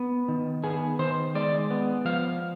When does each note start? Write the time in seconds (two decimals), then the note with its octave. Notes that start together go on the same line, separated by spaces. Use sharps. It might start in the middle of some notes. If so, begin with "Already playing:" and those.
Already playing: B3
0.28 D#3
0.63 B3 G#4
0.99 D#3 C5
1.35 G#3 D5
1.71 B3
2.05 F3 F5